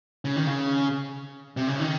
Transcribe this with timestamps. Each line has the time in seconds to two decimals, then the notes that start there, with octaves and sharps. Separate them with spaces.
0.25 C#3
0.36 D#3
0.47 C#3
1.57 C3
1.68 C#3
1.80 D#3